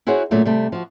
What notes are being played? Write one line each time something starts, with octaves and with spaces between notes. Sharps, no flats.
E4 F#4 G#4 C5 C#5 F#5
A#2 C#3 F#3 A3 A#3
C3 G3 A3
F3 F#4